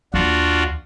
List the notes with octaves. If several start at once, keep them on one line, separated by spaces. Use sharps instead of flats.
D#2 D4 F4 F#4